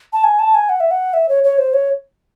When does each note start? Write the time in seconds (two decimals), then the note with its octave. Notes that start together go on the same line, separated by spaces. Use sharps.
0.13 A5
0.24 G#5
0.39 A5
0.55 G#5
0.69 F#5
0.80 E5
0.91 F#5
1.14 E5
1.29 C#5
1.44 C#5
1.58 C5
1.74 C#5